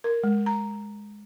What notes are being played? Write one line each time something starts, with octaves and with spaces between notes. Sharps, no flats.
A#4
G#3
A#5